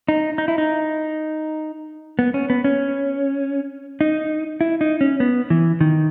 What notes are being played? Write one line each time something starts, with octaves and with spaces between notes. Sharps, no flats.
D#4
D#4
E4
D#4
B3
C#4
B3
C#4
D#4
E4
D#4
C#4
B3
E3
D#3